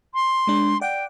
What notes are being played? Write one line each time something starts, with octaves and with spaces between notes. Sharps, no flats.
C6
G#3 D4
D5 F#5 G5